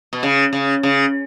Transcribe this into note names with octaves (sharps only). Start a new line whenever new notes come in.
B2
C#3
C#3
C#3